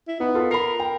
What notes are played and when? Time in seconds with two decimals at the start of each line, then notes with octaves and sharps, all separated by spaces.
0.08 E4
0.20 B3 D#4
0.35 F4 A4 A#4
0.51 A#4 B5 C7
0.80 G5